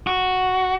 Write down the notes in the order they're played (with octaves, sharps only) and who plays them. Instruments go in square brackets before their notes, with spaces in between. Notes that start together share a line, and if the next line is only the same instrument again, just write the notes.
[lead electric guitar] F#4